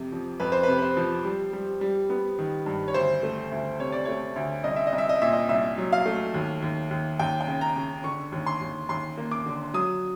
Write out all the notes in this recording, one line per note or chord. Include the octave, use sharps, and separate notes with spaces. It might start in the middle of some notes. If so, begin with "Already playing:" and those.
Already playing: F2 C3
F3
F2 B4
C5
C3 B4
B4
C5
F3
G3
G3
G3
B3
D#3
G2
C#5
D2 C5
A3
D2
C3 C#5
D5
A3 C#5
D2
C2 D#5
E5
D#5
C2
E5
D#5
A#2 E5
D#5
C2 E5
F#3
F5
A3
D#2
D#2
D#2
D#2 G5
G5
C#3
A#5
C#3
D3 C#6
D#2
C6
D#2
D#2 C6
A#3
D6
D3
F#3 D#6